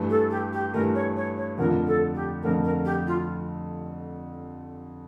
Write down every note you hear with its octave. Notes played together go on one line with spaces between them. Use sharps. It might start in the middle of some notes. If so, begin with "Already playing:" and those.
Already playing: G2 E3 A3
A4
G4
G4
G2 E3 A3 A#4
C#5
C#5
C#5
F2 D3 F3 A3 A#4
A4
G4
F2 D3 F3 A3 A#4
A#4
G4
F4